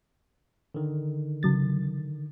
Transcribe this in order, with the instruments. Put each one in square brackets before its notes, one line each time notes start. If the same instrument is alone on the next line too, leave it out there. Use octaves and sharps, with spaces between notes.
[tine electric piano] D3 D#3
[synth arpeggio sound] C#3 F#3 A6